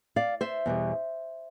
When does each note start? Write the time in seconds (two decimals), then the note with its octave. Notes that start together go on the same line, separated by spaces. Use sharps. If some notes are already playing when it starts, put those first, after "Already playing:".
0.16 D5 F5
0.41 C5 E5
0.66 E2 B2 G3